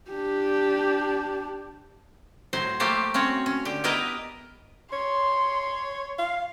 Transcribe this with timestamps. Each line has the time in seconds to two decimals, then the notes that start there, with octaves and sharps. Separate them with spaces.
0.10 D4 G4
2.53 A2 F#3 C5
2.80 F3 A3 A#3 G4 C5
3.14 C4 C#4 F#4 C#5
3.46 C#4
3.65 D3 G4
3.84 B3 E4 G4 A#4 B4 D#5
4.93 C#5 C6
6.18 F5